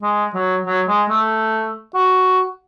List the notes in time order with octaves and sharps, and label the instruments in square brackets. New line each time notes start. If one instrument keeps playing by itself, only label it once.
[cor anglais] G#3
F#3
F#3
G#3
A3
F#4